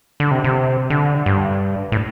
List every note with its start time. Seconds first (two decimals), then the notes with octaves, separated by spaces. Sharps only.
0.20 D3
0.31 C3
0.44 C3
0.90 D3
1.26 G2
1.92 A2